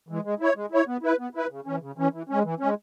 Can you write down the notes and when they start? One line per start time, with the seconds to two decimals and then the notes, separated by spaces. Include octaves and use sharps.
0.09 E3 G#3
0.25 G#3
0.40 E4 C#5
0.56 G#3
0.72 E4 C#5
0.87 B3
1.03 E4 B4
1.19 B3
1.35 E4 B4
1.51 C#3
1.66 E3 C#4
1.82 C#3
1.98 E3 C#4
2.13 E3
2.29 G#3 C#4
2.45 E3
2.60 G#3 C#4